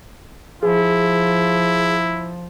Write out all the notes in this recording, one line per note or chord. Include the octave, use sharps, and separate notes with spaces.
F3 E4 G#4